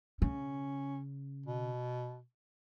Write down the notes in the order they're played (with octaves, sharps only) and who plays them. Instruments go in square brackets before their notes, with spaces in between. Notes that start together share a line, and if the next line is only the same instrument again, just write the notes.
[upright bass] C#3 [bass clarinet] C#4
[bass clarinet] B2